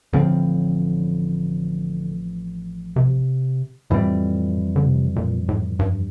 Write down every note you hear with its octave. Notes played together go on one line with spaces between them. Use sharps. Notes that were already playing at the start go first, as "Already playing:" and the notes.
A1 A2 D3 F3 C4
C3
F2 A2 E3 G3 C4
D3
C3
A#2
A2
G2